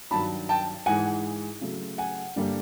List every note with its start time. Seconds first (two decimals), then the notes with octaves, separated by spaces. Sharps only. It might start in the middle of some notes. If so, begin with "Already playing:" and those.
0.11 G2 D#3 F#3 A5 B5
0.49 G5 A5
0.86 G#2 E3 G#3 F#5 G#5
1.61 C#3 F#3 A3
1.98 F#5 G#5
2.36 G2 D3 G3 A#3